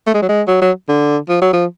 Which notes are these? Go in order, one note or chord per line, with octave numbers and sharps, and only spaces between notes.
A3
G#3
F#3
G#3
F#3
F#3
D3
F3
F#3
F3